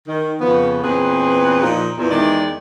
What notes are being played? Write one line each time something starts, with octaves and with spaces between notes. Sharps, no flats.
D#3
F2 C#3 F3 B3
E2 A#2 C4 G#4 B4
A#2 F3 D#4
E2 A#2
E2 D#3 G#3 E4 G4 D5